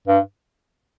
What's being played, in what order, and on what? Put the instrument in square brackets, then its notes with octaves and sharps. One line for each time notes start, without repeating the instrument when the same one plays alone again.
[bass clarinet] G2